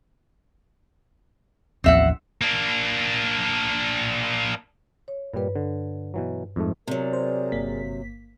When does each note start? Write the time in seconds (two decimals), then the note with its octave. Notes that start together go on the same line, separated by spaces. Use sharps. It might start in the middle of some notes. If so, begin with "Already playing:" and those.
1.84 A1 D#2 F3 C4 E5 F#5
2.41 A#3 D4
5.08 C#5
5.34 G2 A#2 G3 B4
5.56 D3
6.14 B2 E3 F#3
6.56 F2 G#2 A3
6.87 C3 F#3 G#4 A#4 D5
7.13 C5
7.52 G1 A#3 B6